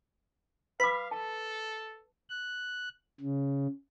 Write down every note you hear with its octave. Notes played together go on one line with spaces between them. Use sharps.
B4 F5 B5 D6
A4 A5
F#6
C#3